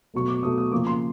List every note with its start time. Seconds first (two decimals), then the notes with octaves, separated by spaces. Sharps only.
0.14 B2 F#3 A3 C#6
0.28 D6
0.43 B2 F#3 A3 D#6
0.58 D#6
0.72 C#3 F3 A#3 D6
0.87 C6